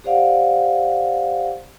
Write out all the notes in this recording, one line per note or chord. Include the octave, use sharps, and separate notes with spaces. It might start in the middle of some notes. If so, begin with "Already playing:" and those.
G4 C5 D5 F5 F#5